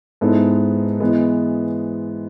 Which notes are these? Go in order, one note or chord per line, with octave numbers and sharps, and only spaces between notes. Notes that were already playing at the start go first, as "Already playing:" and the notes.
G#2 G#3 B3 E4 A4
E3 G#3 B3